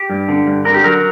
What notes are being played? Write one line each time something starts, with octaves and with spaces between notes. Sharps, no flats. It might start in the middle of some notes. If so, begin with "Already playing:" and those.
Already playing: G4
G2
D3
G2
D3 A#4
G4
F#3 A#4